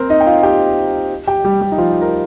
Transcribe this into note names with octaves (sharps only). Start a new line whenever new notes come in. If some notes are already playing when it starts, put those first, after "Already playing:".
Already playing: C4 A#4 C5
D#4 D#5
G5
F4 F5
G4 G5
G4 G5
G3 G4
G3 G4
D#4
F3 F4
A#4